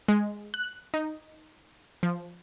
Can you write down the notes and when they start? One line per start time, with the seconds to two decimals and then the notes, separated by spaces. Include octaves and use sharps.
0.08 G#3
0.54 F#6
0.94 D#4
2.03 F3